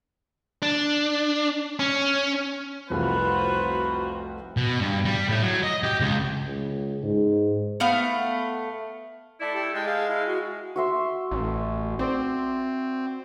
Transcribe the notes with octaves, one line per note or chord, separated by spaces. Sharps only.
D4
C#4
F1 C2 F2 F4 F#4 B4 C5
B2
G2
G3
A2
F#3
D#5
G4
C#2
C#2
G#2
A3 B3 F5 F#5
A3 E4 D5
G4 A5
G#3 G5 A5
G#4 F5 A5
E4 F5
F#4
F#4 E5 C6
A1
C4 C5 D5